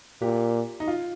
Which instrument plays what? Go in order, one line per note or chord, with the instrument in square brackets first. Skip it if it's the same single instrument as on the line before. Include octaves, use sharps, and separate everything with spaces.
[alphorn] A#2 [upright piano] G4
[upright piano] D#4
F4